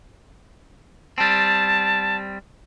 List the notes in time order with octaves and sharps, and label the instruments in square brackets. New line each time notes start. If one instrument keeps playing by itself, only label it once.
[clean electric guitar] G3 C4 [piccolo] A5